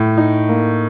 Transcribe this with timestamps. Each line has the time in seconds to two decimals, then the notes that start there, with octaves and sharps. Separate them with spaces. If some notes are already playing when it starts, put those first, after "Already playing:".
Already playing: A2
0.17 D#4
0.49 A#3